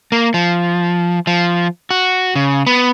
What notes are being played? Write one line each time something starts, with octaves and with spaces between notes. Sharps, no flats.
A#3
F3
F3
F#4
C#3
B3